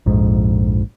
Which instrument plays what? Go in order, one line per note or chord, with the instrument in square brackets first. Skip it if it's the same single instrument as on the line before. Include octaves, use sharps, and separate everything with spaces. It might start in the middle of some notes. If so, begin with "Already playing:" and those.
[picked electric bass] A#1 F2 G#2